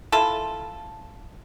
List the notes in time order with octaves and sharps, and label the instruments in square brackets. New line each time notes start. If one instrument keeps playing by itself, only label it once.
[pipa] E4 F4 A4